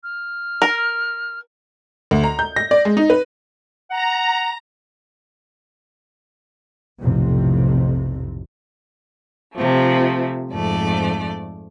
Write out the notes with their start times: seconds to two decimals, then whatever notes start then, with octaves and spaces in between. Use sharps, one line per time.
0.03 F6
0.62 A#4
2.11 D2
2.24 A#5
2.39 G6
2.56 A#6
2.71 D5
2.85 G#3
2.97 D#4
3.10 B4
3.90 F#5 A#5
7.01 B1 F2 A2 C3
9.55 C3 F3 A3
10.52 F2 G#2 A3 D5